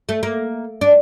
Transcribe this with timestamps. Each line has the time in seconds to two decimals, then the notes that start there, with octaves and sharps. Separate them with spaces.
0.09 A3
0.23 A#3
0.81 D4